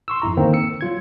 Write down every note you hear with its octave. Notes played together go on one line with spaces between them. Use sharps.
C6 C#6 E6
F2 G#2 E4 A#5
D3 D#3 A#3 C4
E6 C#7
F#3 F4 G#6